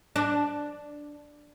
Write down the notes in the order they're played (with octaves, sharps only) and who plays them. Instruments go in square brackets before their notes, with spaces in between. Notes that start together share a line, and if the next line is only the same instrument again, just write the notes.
[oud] D4